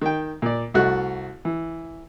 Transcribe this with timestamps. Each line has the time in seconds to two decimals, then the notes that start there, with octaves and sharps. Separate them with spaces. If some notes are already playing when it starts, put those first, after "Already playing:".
0.02 D#3 G5
0.42 A#2 D5
0.74 C2 A3 F#4 F#6
1.45 E3